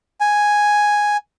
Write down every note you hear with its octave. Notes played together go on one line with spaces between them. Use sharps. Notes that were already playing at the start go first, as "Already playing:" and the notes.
G#5